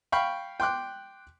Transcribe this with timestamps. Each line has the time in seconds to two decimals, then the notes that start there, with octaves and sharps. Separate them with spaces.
0.12 F5 G5 B5 C#6
0.60 G5 C6 D6 F#6